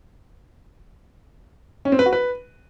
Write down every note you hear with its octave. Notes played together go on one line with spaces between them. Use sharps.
C#4
C4
B4
F#4
B4